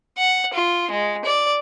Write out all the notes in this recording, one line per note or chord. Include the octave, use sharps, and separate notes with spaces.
F#5
F4
G#3
D5